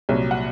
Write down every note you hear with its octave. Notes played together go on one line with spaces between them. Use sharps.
C2 A#2 F#3 C#5
F#5